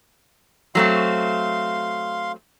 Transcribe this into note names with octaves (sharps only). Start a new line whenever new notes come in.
F#3 A3 C4 F5 C6